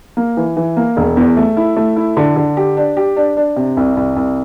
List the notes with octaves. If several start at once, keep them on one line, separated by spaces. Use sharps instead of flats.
A#3
E3
E3
A#3
E1
E2
A3
E4
A3
E4
D3
D3
G4
D4
G4
D4
D4
C3
C2
C2
C2